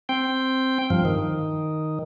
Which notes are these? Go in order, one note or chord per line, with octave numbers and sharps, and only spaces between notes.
C4 G5
G2 F3
D#3